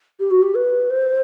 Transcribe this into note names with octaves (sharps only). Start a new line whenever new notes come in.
G4
F#4
G4
B4
C5